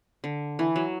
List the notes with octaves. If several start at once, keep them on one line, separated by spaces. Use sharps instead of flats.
D3
E3
F#3